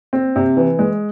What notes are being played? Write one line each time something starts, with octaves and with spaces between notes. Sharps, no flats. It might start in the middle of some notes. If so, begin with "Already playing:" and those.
C4
C3
E3
G#3